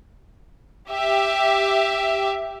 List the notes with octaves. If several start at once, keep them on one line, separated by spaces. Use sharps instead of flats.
G4 E5